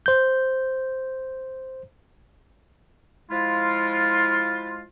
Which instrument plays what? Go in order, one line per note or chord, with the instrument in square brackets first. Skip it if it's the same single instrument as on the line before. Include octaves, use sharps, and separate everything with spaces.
[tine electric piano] C5 G6
[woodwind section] F3 G#3 E4 F4